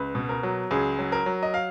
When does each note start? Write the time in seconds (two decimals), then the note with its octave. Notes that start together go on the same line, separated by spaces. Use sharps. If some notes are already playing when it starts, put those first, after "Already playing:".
Already playing: C#2 B4
0.15 B2
0.29 A#4
0.43 F#3
0.71 C#2 G#4
0.99 F#3
1.12 A#4
1.26 F#3
1.43 D#5
1.54 F5